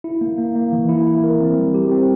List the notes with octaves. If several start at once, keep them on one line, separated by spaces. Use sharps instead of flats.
E4
A#3
A#3
A#3
E3
E4
E4
A#4
C4
G3
G4
C4